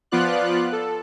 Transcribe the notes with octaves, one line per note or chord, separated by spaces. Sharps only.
F3 B3 F4 D5 F#6
A4